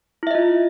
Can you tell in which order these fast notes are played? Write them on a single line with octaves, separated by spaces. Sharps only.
E4 E5 D#5 F4